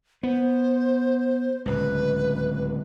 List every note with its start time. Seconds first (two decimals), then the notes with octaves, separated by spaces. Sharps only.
0.23 B3 C5
1.66 D1 C#2 B4